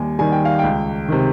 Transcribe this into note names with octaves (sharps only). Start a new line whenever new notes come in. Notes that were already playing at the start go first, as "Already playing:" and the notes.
Already playing: D#2 D#3 G3 G#5
D#3 G3 G#5
G5
F5
C#2 G5
C3 D#3